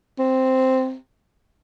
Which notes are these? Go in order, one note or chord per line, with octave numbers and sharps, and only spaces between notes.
C4